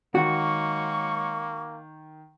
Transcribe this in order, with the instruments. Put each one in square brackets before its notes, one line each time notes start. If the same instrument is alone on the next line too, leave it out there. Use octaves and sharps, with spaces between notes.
[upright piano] D#3 [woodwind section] F#3 G#3 C#6 [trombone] A#3 [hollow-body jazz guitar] F#4